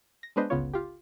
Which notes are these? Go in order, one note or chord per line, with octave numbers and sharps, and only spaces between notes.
A#6
G#3 B3 D4 B4 C5 D#5
G1 C#2 C#3 B3 F4 C#5
F4 G4